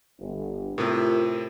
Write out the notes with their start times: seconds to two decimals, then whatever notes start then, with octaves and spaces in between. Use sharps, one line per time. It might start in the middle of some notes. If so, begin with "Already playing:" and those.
0.19 G1
0.78 A2 C3 F4 G4 A#4